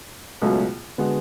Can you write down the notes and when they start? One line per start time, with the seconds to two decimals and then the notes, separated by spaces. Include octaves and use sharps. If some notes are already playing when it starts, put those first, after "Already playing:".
0.41 C#2 B2 F#3 A3
0.98 D3 G#3 B3 F#4